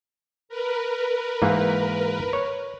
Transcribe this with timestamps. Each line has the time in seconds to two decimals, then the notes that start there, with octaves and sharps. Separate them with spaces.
0.49 A#4 B4
1.42 G#2 E3 A#3
2.33 C#5